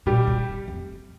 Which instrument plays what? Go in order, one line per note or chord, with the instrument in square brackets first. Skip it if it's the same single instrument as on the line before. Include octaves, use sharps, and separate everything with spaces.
[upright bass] A#2 [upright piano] G3 G4
[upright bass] C3
F2